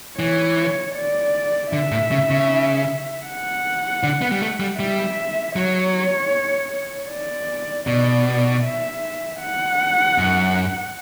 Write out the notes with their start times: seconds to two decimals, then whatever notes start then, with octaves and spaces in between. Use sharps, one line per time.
0.19 E3 C#5
0.96 D5
1.72 D3 E5
1.92 A2
2.11 C#3
2.31 C#3
3.27 F#5
4.03 D3
4.22 B3
4.31 G3
4.41 A3
4.60 G3
4.79 G3 E5
5.56 F#3 C#5
7.10 D5
7.87 B2 D5
8.64 E5
9.41 F#5
10.18 F#2